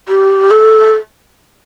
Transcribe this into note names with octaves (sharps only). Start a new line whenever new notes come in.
G4
A4